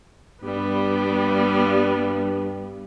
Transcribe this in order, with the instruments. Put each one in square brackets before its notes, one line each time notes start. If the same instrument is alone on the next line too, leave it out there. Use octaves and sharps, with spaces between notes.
[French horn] G2 [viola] G3 B3